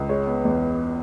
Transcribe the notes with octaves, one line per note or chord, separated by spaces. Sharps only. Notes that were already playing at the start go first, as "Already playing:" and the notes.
Already playing: C#2
G#3 C#5
B3
E2